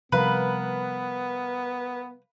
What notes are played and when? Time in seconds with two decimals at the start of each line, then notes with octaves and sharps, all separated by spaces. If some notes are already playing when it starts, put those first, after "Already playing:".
0.12 C3 F3 G3 B3 A#4 B4 F5 B5